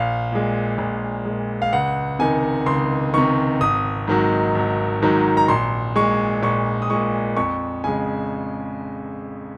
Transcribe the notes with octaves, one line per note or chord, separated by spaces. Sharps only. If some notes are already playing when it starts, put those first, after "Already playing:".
Already playing: A#1 F5
A#2 G#3
A#1
A#2 G#3
F5
C#2 F#5
C3 D#3 G#5
C#2 C6
C3 D#3 C#6
G#1 D#6
G#2 D#3 F#3
G#1
G#2 D#3 F#3
A#5
A#1 C6
A#2 G#3 C#6
A#1 C#6
D#6
A#2 G#3 C#6
F2 C#6
C#3 G#3 G#5